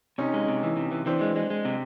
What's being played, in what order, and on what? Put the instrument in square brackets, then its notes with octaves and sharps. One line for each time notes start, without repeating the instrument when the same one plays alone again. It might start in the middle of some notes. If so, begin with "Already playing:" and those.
[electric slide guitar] C3 [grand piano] C#4 D#4
[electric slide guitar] G#3
C3
E3
C3
E3
[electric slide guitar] E3 [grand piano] C4 D4
[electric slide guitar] G#3
G#3
G#3
C3